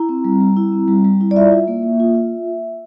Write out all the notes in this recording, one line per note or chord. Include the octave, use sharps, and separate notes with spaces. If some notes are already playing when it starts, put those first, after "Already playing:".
Already playing: E4 A#5
C4
G3
G3
E4
C4
G3
G3
E4
D5
F4 E5
F4
A#3
A#3
F4
F4